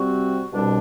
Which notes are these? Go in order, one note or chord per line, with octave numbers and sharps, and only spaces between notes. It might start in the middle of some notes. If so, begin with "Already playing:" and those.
Already playing: C3 G3 C4 F#4
C2 B2 G3 D4